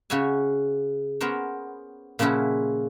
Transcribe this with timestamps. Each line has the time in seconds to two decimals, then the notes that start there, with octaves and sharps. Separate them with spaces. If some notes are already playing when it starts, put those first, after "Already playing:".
0.10 C#3 F#4 C#5 E5 G#5
1.21 B3 C#4 A#4 C5 C#5
2.19 A#2 C#3 F3 C#4 E4 F#4